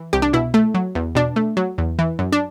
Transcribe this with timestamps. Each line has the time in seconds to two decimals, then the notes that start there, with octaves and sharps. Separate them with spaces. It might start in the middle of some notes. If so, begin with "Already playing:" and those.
Already playing: E3
0.13 C2 G4
0.22 D4
0.33 B2 E4
0.54 A3
0.75 F#3
0.95 E2
1.15 B2 D4
1.36 A3
1.57 F#3
1.78 E2
1.99 E3
2.19 F#2
2.32 D4